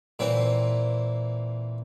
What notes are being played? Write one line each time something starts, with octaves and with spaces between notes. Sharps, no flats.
A#2 E3 C4